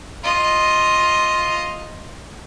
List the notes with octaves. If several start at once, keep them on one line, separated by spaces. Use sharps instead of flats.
F4 D#5